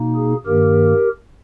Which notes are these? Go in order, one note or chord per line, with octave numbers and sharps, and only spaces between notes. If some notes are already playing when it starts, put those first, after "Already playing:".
Already playing: B2 A#3 D#4
G#4
G2 D#3 A#3 G4 A#4